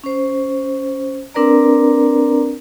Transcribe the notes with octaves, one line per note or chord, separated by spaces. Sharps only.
C#4 C5
C4 D4 A#4 B4 D5 A#5